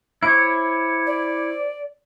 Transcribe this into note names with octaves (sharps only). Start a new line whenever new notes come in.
E4 C5 C#5 D6
D5